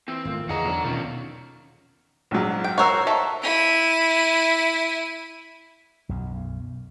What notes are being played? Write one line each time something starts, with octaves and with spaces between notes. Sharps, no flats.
E3 C4
G#1 A3 A#3 F4
E2 D3 E3 G#4 D#5 F#5 A#5
B1 E2 D4
B2 D#3 C#4 F4
A#1 G#2 F#3
G5
F#4 A#4 C5 C#5 E6
D#3 A4 E5
E4 D#7
B1 F#2